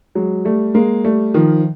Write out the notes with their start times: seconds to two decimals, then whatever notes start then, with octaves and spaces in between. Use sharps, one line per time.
0.15 F#3 G#3
0.45 G3 A3
0.74 G#3 A#3
1.04 G3 A3
1.34 D#3 F3